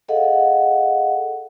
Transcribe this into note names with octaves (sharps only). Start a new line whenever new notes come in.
G#4 A4 D#5 F5 F#5